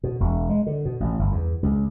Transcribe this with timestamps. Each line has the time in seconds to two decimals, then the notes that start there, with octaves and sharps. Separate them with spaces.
0.03 B2
0.20 E1
0.49 G#3
0.66 D3
0.85 B2
1.00 A1
1.19 G1
1.32 E2
1.63 C#2